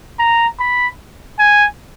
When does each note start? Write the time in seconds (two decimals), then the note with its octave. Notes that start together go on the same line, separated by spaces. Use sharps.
0.19 A#5
0.59 B5
1.39 G#5